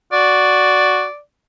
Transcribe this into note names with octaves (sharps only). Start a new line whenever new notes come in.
F#4 D5